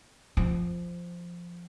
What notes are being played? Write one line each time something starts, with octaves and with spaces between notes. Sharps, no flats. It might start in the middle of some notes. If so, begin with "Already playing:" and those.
F3